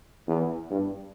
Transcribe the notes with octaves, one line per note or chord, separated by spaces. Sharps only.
E2
G2